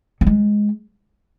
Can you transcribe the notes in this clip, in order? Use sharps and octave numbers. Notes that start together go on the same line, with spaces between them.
F#3
G#3